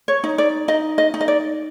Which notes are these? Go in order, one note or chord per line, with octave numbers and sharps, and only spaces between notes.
C#5
D#4
D5
D#4 D#5
D#5
D#4
D#5
D5